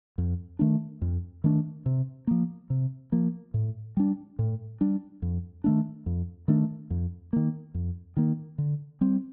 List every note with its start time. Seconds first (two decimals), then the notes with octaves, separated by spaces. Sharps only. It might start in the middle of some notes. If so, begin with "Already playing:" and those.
0.18 F2
0.59 D#3 A3 D4
1.02 F2
1.44 D#3 A3 D4
1.86 C3
2.27 F3 A#3
2.70 C3
3.12 F3 A#3
3.54 A2
3.97 G3 D4
4.39 A2
4.81 G3 D4
5.22 F2
5.64 D#3 A3 D4
6.06 F2
6.48 D#3 A3 D4
6.90 F2
7.33 D#3 A#3
7.74 F2
8.17 D#3 A#3
8.58 D3
9.01 G3 C4